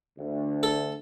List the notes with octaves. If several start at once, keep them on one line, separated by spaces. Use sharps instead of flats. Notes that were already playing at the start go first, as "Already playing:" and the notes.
D2
A4